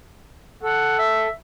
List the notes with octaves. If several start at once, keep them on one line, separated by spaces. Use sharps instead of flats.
A4 F#5
E5